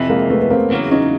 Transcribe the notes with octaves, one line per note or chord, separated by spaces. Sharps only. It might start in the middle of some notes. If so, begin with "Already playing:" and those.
Already playing: F2 C3 E3
G#3 A#3
A3 B3
B3
A#3 C4
E2 C#3 F#3 A#3
C#4 D#4